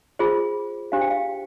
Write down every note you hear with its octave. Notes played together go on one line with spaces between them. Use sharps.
F4 G#4 C5
D4 G4 C5 F5
G5
F5